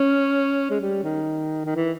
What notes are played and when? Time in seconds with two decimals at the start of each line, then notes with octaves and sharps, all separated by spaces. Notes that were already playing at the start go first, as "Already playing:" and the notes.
Already playing: C#4
0.71 G#3
0.81 G3
1.04 D#3
1.65 D#3
1.75 E3